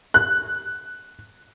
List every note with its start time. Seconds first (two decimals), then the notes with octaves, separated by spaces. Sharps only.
0.14 F#6